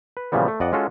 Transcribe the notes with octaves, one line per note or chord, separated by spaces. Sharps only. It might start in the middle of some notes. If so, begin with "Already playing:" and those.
B4
A#2 C#3 E3 F3 G3 B3
A3
F2 D5 D#5 F#5
G#3 C#4 F4 F#4 A4